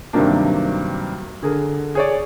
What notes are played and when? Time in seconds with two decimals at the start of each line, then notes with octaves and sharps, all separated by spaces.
0.13 G2 C3 D#3 F#3 A#3 D4
1.43 D3 G#4 A#4
1.95 G#4 C#5 D5